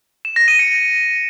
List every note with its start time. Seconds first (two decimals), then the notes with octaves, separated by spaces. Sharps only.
0.25 E7
0.36 A#6
0.48 D#7
0.59 C#7